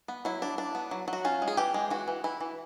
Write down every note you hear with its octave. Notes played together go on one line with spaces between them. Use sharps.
B3
F#3 E4
D4
D4
B3
F#3
F#3
F#4
C#4 F4
G#3
G#4
E3 G4
G#3
E3 F#4
E3
E3 E4
E3